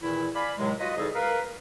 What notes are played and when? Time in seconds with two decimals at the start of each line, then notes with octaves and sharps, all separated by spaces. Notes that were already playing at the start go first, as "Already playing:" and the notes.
0.02 E2 A#2 D#3 E3 E4
0.35 D5 F5 G#5 B5
0.58 D#2 A2 C3 F#3 G#3
0.80 F4 F#4 B4 D#5
0.97 E2 C#3 G3 D#4 G#4 A4
1.14 A#4 B4 F5